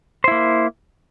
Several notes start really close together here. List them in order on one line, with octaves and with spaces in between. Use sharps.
C5 E4 A#3